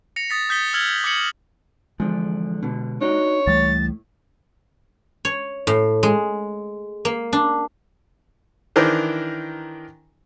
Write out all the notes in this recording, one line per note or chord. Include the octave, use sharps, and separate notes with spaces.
A#6 C#7 F7
D#6 A6 B6
D#6 G6 A6 B6 G7
E6 F6 G#6 F#7 G7
D6 G6 G#6 C#7 F#7 G7
E2 D3 F3 G#3
B2 D3
D4 D#4 F#4 C#5
C#2 A2 E3 G3 A6
C#5
A2
G#3
A#3
D4
D#3 E3 D4 A#4 C5